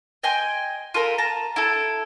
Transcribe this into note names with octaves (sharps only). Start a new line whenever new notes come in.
D#5 G5 G#5 C6
F4 A4 A#4 B5
A5 A#5
E4 A4